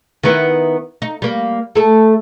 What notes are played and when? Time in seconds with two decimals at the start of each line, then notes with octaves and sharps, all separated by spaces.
0.23 D#3 B3 E4
1.02 D#4
1.22 G3 A#3
1.75 A3 A4